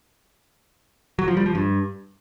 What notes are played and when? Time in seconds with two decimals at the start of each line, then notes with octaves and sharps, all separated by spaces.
1.19 F#3
1.28 F3
1.37 G3
1.46 F3
1.55 G2